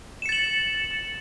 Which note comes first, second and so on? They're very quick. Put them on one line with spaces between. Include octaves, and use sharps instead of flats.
E7 C#7 A6 F#7